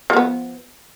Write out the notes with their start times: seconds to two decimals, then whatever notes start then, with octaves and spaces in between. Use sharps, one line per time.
0.10 F3
0.13 A#3
0.17 B3